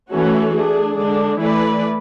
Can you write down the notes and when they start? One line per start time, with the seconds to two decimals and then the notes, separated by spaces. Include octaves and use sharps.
0.10 E3 A3 C#4 F#4 A4
0.53 A3 D4 G#4
0.96 D3 G#3 D4
1.39 E3 A3 E4 B4 D5